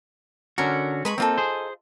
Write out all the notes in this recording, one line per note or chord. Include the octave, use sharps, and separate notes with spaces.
D3 C#4 F#4 A#4
G#3 B4 B5 C#6
A#3 C4 D#4 F4 A4
G#4 C5